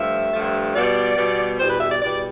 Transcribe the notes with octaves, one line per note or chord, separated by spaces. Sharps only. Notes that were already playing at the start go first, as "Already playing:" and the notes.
Already playing: G2 F3 A3 E5
G2 F3 A3
B2 G3 B3 D5
B2 G3 B3
E2 B2 G3 B3 C5
B4
E5
D5
E2 B2 G3 B3 D5